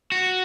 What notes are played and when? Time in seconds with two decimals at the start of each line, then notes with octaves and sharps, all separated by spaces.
0.12 F#4